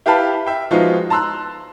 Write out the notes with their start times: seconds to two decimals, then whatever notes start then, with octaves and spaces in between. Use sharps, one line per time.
0.06 E4 G4 B4 F5 A5 B5
0.46 E5 G5
0.71 F3 G#3 B3 D#4 F4 F#4
1.10 A5 A#5 C6 E6 F#6